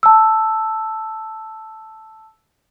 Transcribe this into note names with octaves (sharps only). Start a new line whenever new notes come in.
A5 E6